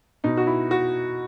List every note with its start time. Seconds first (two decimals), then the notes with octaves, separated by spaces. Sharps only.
0.24 B2 D#4
0.37 F#4
0.47 E4
0.71 F#4